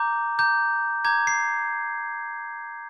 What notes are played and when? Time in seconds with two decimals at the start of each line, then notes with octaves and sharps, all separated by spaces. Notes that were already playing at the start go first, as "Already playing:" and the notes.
Already playing: A#5 D6 G6
0.39 A#5 D6 G6
1.05 A#5 D6 G6 G#6
1.27 C7